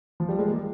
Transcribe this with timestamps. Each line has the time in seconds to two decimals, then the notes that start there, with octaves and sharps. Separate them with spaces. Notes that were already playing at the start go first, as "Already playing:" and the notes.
0.20 F3
0.29 G3
0.39 G#3
0.48 A#3